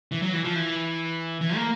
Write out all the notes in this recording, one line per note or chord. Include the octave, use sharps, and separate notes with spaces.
E3
F#3
E3
F3
E3
E3
A#3